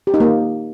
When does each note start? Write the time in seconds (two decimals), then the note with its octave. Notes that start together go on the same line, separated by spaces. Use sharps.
0.07 G4
0.14 D#4
0.20 A#3